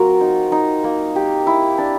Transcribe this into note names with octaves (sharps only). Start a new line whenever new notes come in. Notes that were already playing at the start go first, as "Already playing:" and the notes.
Already playing: F#3 A#3 C4 F4 A#4
D#4
D#4
A#3
G4
E4
D4